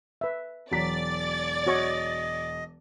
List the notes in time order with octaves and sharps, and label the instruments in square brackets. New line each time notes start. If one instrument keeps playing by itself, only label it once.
[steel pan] B4 E5
[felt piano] E1 F#3 B6 [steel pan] F#4 A#5 [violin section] D5 A6
[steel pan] F#4 C#5 C#6 [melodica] D#5